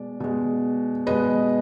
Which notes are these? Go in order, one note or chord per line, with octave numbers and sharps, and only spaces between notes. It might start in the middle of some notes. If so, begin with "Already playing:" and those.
Already playing: B2 G#3 D5
B2 G#3
B2 G#3 B4 D#5